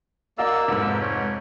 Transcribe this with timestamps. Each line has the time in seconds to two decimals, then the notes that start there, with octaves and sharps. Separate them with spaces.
0.38 A#3 F#4 D5 D#5 F5 E6
0.68 F1 G#2
1.01 C#5